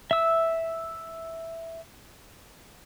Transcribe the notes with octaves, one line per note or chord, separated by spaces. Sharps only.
E5 E6